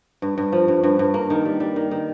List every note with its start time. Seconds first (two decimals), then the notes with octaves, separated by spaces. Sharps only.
0.22 G2
0.38 G2
0.52 F3
0.68 G2
0.83 G2
0.99 G2
1.14 A#3
1.30 D#3
1.45 G3
1.60 G3
1.76 D#3
1.91 D#3